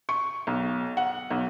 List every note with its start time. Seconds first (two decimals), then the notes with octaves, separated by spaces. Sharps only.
0.09 C#6
0.47 B1
0.97 F#5
1.31 B1